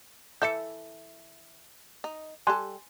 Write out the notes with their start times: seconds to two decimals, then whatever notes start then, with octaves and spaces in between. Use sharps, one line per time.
0.42 E3 A4 E5 G6 C#7
2.04 D#4
2.47 G3 G4 A4 G#5 C6 F#6